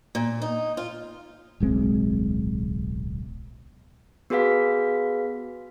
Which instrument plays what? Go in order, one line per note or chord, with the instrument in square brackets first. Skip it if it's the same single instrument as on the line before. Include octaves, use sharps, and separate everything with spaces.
[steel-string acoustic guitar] A#2
D#4
F4
[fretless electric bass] D1 B1 G#3 C4
[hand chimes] B3 F#4 G#4 B4 F5 B6